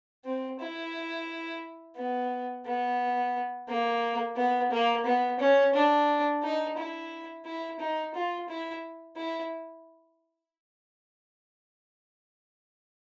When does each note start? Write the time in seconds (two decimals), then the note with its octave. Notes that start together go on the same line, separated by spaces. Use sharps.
0.25 C4
0.60 E4
1.96 B3
2.66 B3
3.68 A#3
4.36 B3
4.71 A#3
5.06 B3
5.39 C#4
5.74 D4
6.43 D#4
6.77 E4
7.45 E4
7.80 D#4
8.14 F4
8.49 E4
9.16 E4